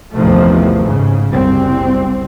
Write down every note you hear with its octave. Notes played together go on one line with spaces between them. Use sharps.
A1 E2 C3 D#3 F3 A3
G#2 C#3
F#1 C2 C4